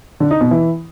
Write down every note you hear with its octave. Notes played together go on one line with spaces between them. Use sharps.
D3
D#4
B2
E3